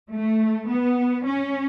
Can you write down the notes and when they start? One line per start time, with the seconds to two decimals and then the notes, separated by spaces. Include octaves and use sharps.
0.13 A3
0.69 B3
1.25 C#4